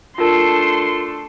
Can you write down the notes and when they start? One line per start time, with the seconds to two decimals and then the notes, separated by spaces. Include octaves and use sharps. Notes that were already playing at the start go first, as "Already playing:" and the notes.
0.18 A3 D4 F4 A4 A#4 C6 C7